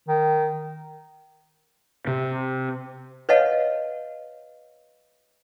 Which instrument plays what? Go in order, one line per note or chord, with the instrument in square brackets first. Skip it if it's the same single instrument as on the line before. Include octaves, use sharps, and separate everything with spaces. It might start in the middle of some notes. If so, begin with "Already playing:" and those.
[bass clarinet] D#3
[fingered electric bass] C3
[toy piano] B4 C#5 D#5 F5 F#5 A5